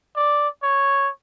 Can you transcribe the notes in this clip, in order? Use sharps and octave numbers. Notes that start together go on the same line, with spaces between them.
D5
C#5